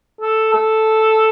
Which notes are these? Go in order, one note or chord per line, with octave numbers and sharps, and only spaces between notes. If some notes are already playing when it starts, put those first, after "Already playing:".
A4
A4